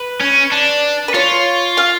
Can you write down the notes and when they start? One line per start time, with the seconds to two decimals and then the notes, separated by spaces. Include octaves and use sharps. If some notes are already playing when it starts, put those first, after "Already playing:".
Already playing: B4
0.21 C#4
0.52 D4
1.08 B4
1.14 F4 C#5
1.77 F5